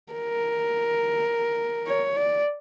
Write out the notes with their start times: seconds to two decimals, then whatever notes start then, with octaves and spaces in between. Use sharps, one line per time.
0.13 A#4
1.87 C#5
2.17 D5